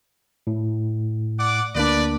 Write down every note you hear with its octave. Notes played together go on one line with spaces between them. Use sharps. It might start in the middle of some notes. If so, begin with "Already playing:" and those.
A2
D5 F#5 D6
D2 A#3 D4 B4 D5